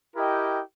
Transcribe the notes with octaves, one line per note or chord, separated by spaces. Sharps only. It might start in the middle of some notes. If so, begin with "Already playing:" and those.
E4 G4 A#4 D#5 G5